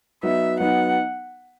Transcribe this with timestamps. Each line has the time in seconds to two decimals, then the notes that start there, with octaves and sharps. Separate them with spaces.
0.23 F#3 B3 D#4 E5
0.60 F#3 B3 D#4 F#5